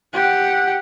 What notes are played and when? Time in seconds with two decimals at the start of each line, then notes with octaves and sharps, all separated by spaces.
0.13 G4 F#5